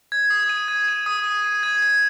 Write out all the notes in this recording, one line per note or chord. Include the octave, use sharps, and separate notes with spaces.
G#6
D#6
D#7
G#6
D#7
D#6
D#7
D#7
G#6
G#6